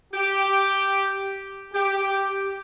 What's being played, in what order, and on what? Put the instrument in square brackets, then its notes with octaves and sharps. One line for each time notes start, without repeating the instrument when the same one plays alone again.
[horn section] G4
G4